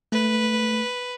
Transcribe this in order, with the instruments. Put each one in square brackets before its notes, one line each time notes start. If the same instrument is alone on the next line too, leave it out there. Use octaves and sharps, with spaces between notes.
[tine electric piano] A3 [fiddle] B4